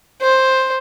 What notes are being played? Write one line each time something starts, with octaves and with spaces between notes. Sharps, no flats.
C5